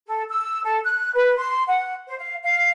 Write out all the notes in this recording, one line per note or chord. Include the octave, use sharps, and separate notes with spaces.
A4
E6
A4
F#6
B4
C6
F#5
C5
F5
F5